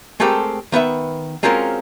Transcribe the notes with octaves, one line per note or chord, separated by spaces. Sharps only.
G#3 A3 C4 G4 A4 A#4
D#3 B3 B4 E5
F#3 G#3 C4 C#4 F4 A#4